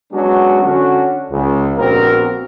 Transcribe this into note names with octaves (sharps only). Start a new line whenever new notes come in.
F#3 G#3 B3 C#4 D4 F#4
D3 C#4 D4 F#4
C#2
A#1 B3 C4 F#4 A#4